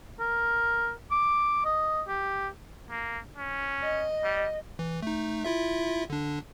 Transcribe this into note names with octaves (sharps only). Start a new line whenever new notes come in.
A#4
D6
D#5
G4
A#3
C#4
D#5
G3
E3
A3 D#4
E4 F4 E5
D3 D4